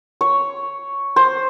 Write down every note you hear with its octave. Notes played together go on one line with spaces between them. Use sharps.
C#5
C5